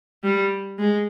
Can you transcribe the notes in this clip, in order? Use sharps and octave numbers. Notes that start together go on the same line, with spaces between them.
G3
G#3